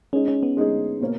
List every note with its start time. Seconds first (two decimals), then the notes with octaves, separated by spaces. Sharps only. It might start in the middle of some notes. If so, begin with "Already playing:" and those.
0.13 G#3 C#4 D#4 G#4
0.28 C#4
0.43 B3
0.57 G#3 D#4 G#4
1.01 B2 A#3 C#4